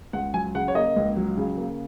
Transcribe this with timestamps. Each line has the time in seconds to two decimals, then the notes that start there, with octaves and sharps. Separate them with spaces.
0.13 C#2 F#5
0.34 F#3 G#5
0.55 C#3 F#5
0.68 C#5
0.75 A#3 D#5
0.96 C#2
1.16 F#3
1.37 C#3
1.58 A#3